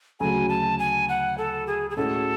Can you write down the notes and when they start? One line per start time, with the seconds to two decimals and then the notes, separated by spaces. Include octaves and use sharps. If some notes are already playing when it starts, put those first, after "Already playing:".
0.20 D2 C#3 F#3 A3 G#5
0.49 A5
0.79 G#5
1.09 F#5
1.38 A4
1.67 G#4
1.90 G#4
1.97 A2 G#3 C#4 F#4 A4